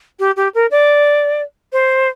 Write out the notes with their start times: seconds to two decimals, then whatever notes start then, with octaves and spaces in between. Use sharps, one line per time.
0.19 G4
0.36 G4
0.55 A#4
0.71 D5
1.73 C5